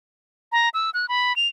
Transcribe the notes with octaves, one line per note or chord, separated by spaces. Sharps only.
A#5
E6
F#6
B5
F7